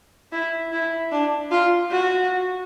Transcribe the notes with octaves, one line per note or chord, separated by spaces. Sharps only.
E4
E4
D4
F4
F#4